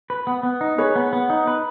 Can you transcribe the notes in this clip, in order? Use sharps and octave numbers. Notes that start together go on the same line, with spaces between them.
B4
B3
B3
D#4
G#4 B4 C#5
B3
B3
D#4
B4